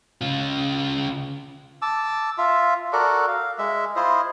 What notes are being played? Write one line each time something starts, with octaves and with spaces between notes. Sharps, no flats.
C#3 F4
A5 D6 E6
F4 E5
F#4 A4 A#4 D5
F5
G#3 E5
E4 F4 C5 D#5